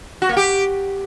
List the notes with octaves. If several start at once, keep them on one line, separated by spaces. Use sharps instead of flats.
F#4
A#3
G4